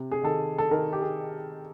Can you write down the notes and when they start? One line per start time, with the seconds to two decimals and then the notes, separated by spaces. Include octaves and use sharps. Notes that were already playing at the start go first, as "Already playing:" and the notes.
Already playing: C3
0.12 G#4
0.23 D#3 A4
0.58 A4
0.71 D#3 A#4
0.93 G4
1.02 G#4